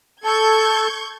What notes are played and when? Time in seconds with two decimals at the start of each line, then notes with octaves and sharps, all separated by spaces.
0.24 A4 C#6 G6 G#6